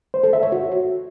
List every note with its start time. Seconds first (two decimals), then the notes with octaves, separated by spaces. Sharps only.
0.14 C5
0.24 A4
0.33 E5
0.43 C#5
0.52 F#4